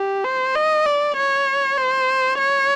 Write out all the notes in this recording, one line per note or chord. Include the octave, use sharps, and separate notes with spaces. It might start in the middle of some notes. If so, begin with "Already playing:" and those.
Already playing: G4
C5
D#5
D5
C#5
C5
C#5